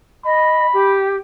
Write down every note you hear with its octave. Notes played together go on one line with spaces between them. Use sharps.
D#5 B5
G4